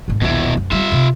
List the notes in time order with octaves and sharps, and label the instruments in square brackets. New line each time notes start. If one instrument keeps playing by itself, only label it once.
[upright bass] G#1 G#2
[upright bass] A#1 D#2 [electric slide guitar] B2 E4
[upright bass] F#2
[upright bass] G3 G#3 [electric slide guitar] F4 E5
[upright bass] C3